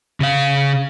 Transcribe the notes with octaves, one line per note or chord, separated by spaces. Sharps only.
C#3 F5